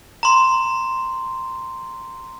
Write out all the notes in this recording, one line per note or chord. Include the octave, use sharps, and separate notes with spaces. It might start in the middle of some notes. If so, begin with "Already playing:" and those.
A#5 C6